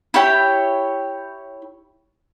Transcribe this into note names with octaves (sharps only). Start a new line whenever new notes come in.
E4 G4 C#5 G5